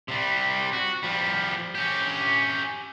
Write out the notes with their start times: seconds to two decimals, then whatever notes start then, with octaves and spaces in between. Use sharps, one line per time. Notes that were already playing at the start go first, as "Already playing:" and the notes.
0.08 C3 G3
0.73 F#4
1.03 F3 G3
1.75 C#4 G4